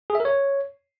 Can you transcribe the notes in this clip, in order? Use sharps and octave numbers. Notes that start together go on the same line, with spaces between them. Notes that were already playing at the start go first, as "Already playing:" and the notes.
G#4
E5
A#4
C#5